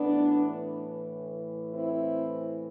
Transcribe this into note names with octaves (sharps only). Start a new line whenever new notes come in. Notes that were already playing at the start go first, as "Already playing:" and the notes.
Already playing: A2 E3 B3 D4
C4 E4